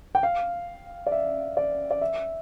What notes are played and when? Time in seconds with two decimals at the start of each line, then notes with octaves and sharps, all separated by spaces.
0.15 G5
0.23 F5
1.07 D5
1.12 E5
1.57 D5
1.91 D5
2.01 E5